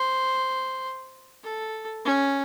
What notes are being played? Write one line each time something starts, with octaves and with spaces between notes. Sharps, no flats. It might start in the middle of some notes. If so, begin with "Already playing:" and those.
Already playing: C5
A4
C#4